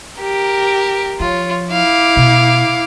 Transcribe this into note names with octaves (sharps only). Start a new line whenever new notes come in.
G4 A#4
F3 F4 C#5
E4 F5 D6
B2